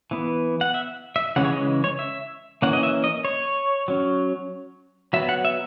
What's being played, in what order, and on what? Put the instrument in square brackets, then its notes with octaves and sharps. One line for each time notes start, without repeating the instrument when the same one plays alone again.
[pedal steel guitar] E3 B3
F#5
E5
E5
C#3 E3 G#3 C#4 F#5
C#5
D#5
C#5
E5
E3 A#3 C#4 F#5
D#5
E5
D#5
C#5
F#3 C#4
F#3 B3 E5
F#5
E5